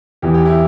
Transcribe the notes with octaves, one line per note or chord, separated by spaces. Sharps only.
E2 E3 G4
G4
E4